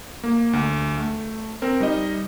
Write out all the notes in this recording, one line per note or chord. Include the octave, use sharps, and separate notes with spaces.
A#3
D2
A3
C4 A#4
G3 D#4 D#5